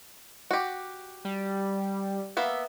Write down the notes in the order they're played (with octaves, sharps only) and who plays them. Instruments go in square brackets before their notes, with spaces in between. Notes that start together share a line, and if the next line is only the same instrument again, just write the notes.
[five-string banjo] F#4 G4
[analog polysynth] G3
[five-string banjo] A#3 B3 F5 [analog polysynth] E5